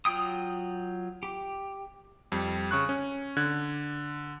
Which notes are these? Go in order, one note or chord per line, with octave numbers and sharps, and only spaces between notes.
F#3 F4 G5 D#6
G4
F2 G3
C#3 C#6 F#6
C#4
D3 F#6 G#6